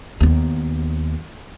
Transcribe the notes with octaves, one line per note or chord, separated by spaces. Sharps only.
D#2 B3